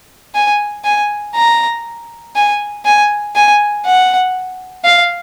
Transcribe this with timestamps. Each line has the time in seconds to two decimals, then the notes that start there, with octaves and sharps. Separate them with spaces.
0.35 G#5
0.84 G#5
1.35 A#5
2.36 G#5
2.85 G#5
3.35 G#5
3.86 F#5
4.85 F5